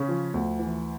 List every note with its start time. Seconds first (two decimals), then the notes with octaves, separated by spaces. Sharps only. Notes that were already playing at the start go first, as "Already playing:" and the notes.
Already playing: C#3 C#4
0.08 F3
0.34 D2
0.59 E3